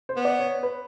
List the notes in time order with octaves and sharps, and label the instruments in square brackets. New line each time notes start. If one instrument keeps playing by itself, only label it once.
[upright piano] C5
[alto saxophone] B3
[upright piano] D5
C#5
B4